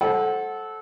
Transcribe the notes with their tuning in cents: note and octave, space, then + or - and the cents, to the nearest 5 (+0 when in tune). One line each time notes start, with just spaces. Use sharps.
A4 -15 C5 +30 F#5 +0